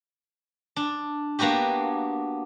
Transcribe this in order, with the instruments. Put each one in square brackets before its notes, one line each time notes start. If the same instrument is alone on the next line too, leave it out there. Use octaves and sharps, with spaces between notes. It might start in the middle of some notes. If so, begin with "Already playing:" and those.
[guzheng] D4
A#3 B3 D4 F#4 G4